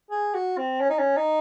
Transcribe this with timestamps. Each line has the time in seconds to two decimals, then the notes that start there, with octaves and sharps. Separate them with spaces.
0.11 G#4
0.34 F#4
0.58 C4
0.81 C#4
0.90 D#4
0.99 C#4
1.17 D#4